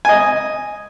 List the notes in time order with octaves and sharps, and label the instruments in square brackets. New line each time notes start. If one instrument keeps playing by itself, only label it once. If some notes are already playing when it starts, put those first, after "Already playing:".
[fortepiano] D#5 G#5